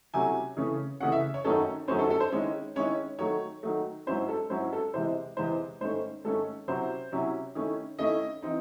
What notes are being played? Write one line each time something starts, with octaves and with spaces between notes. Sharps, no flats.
C3 F#3 A3 C#4 E4 G#5
C#3 E3 A3 C#4
C#3 E3 A3 C#4 F#5
E5
C#5
F#2 D#3 F#3 A3 C#4 A4
F#2 D#3 F#3 A3 C#4 C5
A4
A4
C5
D#3 G#3 C#4 E4 C#5
D#3 G#3 C#4 E4 C#5
D#3 F#3 A3 C#5
D#3 F#3 A3
G#2 F#3 C#4 E4 C5
A4
G#2 F#3 C#4 E4 C5
A4
E2 C3 E3 G#3 C5
E2 C3 E3 G#3 C5
G#2 D#3 A3 C#4 C5
G#2 D#3 A3 C#4 A4
C3 F#3 C#4 E4 C5
C3 F#3 C#4 E4
D#3 A3 C#4 E4
D#3 A3 C#4 E4 D#5
E3 C4 D#4